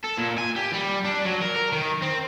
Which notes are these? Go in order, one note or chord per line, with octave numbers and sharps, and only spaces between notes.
A4
A#2
G#5
G4
G3
D4
F#3
A#4
A#4
D#3
C4